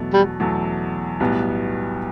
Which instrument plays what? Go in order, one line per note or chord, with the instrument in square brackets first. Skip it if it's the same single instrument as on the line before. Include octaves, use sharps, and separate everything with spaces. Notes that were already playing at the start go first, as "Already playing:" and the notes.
Already playing: [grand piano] E2 B2 F#3 A3
[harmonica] G3
[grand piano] E2 B2 F#3 A3
B1 A2 G3 B3